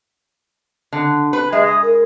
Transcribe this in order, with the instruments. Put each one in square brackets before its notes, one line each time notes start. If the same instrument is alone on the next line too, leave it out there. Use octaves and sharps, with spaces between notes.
[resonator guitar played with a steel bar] D3
B4
[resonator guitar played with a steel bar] G#3 [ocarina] E5
[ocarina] D#6
A#4